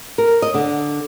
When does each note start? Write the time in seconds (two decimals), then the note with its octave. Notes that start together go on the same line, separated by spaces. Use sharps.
0.18 A#4
0.42 D#5
0.54 D3